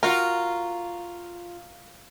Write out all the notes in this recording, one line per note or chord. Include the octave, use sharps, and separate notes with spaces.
F4 F#4 A#4